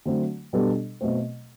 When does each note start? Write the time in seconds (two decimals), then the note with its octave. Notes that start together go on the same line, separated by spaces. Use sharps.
0.06 D3 F#3 A3 C4
0.53 B2 G3 B3 D4 A4
1.01 B2 A3 C4